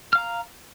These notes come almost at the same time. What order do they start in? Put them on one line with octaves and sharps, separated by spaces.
F6 F5 A#5